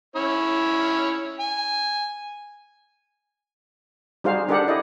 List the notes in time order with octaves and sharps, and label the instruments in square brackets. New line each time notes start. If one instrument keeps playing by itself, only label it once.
[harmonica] C#4 E4 C#5
G#5
[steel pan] G3 D#4 F#4 G#4 C5 F5
D4 G4 A4 A#4 D5 F#5
E4 D5 D#5